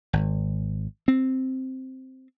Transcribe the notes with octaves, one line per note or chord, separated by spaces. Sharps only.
G#1
C4